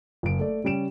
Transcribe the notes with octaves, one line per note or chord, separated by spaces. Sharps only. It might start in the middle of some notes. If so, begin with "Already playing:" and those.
F#1 D7
A3 D5
C#3 G3 C#4 D7 E7